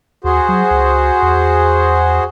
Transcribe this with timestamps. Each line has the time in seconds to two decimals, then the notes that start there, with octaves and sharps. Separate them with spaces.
0.24 D#2 F#4 G#4 C5
0.49 F#3
0.71 C#2
1.22 E2